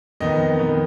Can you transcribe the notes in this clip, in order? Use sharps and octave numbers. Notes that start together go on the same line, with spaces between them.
F2 D#3 B3 D#5
F2 D#3 B3